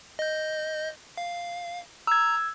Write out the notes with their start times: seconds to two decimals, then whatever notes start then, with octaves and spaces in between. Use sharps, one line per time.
0.19 D#5 G6
1.17 F5
2.07 A#5 E6 G#6